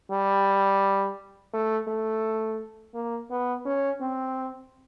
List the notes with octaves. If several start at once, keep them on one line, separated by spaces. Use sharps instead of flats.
G3
A3
A3
A#3
B3
C#4
C4